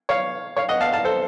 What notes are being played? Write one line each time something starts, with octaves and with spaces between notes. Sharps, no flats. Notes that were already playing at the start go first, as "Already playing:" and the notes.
C#5 F5
C#5 F5
D#5 F#5
F5 A5
F5 A5
A4 C5